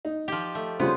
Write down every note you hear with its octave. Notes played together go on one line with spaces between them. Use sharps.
D#4
F3 G4
A3
C#3 G3 B3 C#4 F4 C5